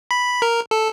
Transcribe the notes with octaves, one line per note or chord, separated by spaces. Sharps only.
B5
A#4
A4